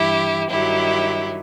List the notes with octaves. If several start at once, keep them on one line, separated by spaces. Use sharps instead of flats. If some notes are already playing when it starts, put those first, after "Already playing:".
Already playing: G2 E3 E4 G4
G2 D#3 F#3 E4 G4